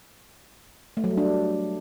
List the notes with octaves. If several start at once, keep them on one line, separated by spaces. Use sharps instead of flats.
A3
F#3
G3
D4